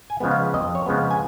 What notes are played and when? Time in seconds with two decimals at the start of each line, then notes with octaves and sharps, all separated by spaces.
0.10 G#5
0.20 C#3 F3 G#3 B3
0.31 F5
0.54 F2 D#5
0.75 C#5
0.86 C#3 F3 G#3 B3
0.98 F5
1.11 G#5